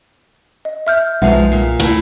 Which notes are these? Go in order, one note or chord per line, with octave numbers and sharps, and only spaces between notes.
D#5
E5 F6 G6
B1 F3 G#3 D#4 B4 E5 F#5
A#2
D2 A2